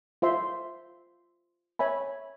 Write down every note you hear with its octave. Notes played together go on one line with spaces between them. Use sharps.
F4 C5 E5 C6
C#5 E5 G#5 B5